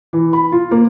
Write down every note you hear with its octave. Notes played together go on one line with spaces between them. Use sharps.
E3
B5
F4
A#3